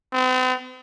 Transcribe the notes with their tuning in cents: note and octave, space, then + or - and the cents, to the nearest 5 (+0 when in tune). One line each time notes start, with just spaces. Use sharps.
C4 -45